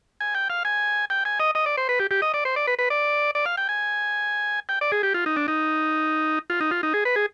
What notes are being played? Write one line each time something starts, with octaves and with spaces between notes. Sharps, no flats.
G#5
G5
F5
G#5
G5
G#5
D#5
D#5
D5
C5
B4
G4
G4
D#5
D5
C5
D5
B4
B4
D5
D5
F5
G5
G#5
G5
D5
G#4
G4
F4
D#4
D4
D#4
F4
D#4
F4
D#4
G#4
B4
G#4